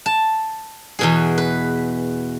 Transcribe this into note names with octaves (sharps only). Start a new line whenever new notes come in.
A5
E2 B2 G#4
B4